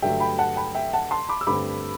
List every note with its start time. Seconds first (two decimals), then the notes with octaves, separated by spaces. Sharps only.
0.02 G2 D3 F#3 A3 E5 G5
0.20 G5 B5
0.38 F#5 A5
0.56 G5 B5
0.75 E5 G5
0.93 F#5 A5
1.11 A5 C6
1.29 B5 D6
1.41 E6
1.47 G2 D3 A3 C4 B5 D6